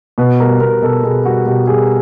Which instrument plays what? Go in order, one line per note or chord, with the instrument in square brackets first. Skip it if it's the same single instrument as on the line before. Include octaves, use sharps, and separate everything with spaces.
[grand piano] B2 B4
G3 A#4
B2 A#4
B2 A4
B2 G#4
G3 F#4
B2 G4
G3 G#4